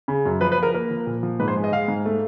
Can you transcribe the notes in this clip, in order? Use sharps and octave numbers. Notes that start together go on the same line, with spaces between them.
C#3
F#2
F3 B4
B4
F3 A#4
A#3 A#4
F3
A#2
F3
G#2 B4
C5
G#3
D#5
G#3 F5
G#2
A3